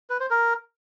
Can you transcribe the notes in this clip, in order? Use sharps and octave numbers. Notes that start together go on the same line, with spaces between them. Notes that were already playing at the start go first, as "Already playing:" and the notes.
B4
C5
A#4